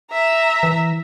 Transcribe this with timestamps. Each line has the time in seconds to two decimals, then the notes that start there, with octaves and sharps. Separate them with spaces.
0.11 E5 A#5
0.63 E3